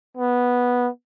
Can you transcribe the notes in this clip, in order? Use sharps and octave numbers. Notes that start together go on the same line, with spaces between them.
B3